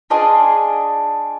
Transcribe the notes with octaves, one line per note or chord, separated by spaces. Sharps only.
D4 F4 G#4 D#5